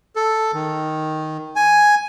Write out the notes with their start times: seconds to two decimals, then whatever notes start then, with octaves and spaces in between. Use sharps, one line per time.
0.16 A4
0.54 D#3
1.56 G#5